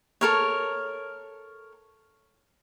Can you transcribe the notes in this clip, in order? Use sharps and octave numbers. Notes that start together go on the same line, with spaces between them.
A4 A#4 C#5